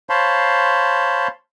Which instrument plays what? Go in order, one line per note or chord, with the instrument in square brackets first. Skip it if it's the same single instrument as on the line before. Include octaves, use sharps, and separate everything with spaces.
[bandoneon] C5 C#5 F5 A5 B5 C6